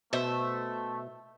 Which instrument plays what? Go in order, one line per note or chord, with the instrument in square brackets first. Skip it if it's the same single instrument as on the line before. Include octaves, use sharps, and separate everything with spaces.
[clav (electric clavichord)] B2 [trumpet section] A3 [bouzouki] C5 E5